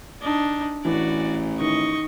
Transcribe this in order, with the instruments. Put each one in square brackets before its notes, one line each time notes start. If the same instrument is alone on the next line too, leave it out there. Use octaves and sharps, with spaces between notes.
[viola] D4 D#4
[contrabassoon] A1 [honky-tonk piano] E3 [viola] F#4 D5
[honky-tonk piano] D#3 [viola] D#5 C#6